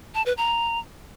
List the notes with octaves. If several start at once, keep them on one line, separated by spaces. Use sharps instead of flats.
A5
B4
A#5